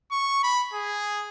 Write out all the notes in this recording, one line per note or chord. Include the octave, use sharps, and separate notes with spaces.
C#6
B5
G#4